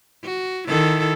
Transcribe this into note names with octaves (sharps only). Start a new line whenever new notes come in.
F#4
D#3 E4 A4